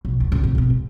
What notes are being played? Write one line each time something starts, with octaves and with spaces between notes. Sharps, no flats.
B1
D2
C#2 A#2
D2 C3
G#1 B2
G#2